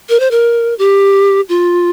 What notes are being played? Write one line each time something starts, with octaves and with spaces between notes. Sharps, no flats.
A#4
C5
A#4
G4
F4